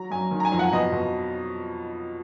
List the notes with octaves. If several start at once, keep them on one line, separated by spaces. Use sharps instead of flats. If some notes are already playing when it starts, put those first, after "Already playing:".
Already playing: F#3 A#5
F#2 G#5
D#3
A#5
G#5
F2
F#5
B2 D#5
B2